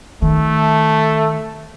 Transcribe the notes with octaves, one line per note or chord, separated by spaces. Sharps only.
D#3 A3